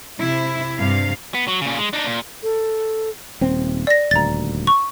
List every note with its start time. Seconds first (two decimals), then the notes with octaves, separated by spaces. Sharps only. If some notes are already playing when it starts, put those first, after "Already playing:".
0.18 C3 E4
0.77 G2 C3 F5
1.35 B3
1.48 F#3
1.61 A#2 C#3
1.78 G#3
1.93 D4 D#4
2.06 A#2
2.43 A4
3.41 D#1 C4
3.87 D5 A#6
4.11 D#1 D2 A#5 A6
4.67 C#6